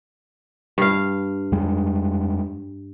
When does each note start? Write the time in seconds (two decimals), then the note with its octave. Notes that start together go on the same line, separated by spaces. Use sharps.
0.78 G2 F5
1.52 F2 G3 G#3